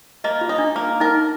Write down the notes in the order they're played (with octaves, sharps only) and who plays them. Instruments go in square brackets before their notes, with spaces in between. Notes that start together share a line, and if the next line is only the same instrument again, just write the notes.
[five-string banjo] A#3 [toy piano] D#5
[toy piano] F4
[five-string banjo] D#4
[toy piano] D4
[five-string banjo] A#3
[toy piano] D#4 [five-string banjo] A#4